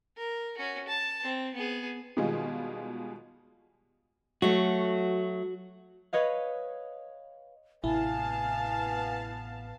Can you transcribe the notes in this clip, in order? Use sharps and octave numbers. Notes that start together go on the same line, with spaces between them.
A#4
C#4 F#4
A5
C4
B3 G#4
B2 D#3 G3 G#3 F4 G#4
F#3 A3 F#4
B4 C#5 D#5 F5
A1 A2 C3 B3 E4 F5 G#5 A5